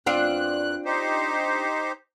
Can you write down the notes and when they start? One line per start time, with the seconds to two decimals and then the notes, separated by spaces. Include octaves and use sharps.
0.06 E2 C4 D4 F4 F#6
0.85 D#4 G4 C5